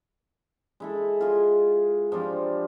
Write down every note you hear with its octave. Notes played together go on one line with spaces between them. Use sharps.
G#3 E4 A4
F4 G#4 D#5
F3 G3 C4 D4